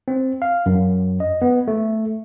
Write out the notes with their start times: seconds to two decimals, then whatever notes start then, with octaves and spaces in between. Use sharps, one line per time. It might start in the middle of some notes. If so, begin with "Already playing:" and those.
0.08 C4
0.42 F5
0.66 F#2
1.20 D#5
1.42 B3
1.68 A3